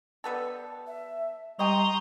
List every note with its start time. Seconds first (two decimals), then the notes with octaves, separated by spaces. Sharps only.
0.24 G3 B3 A4
0.87 E5
1.59 G3 D#5 G5 A#5 C6 C#6 D#6